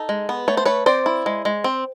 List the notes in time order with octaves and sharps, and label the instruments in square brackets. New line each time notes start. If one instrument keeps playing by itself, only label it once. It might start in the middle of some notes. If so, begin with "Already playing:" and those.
Already playing: [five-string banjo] D#4 A4
G#3
B3
A3 C#5
C5
A3 B4 C#5
C4 C5 D5
E4
G#3
G#3
C4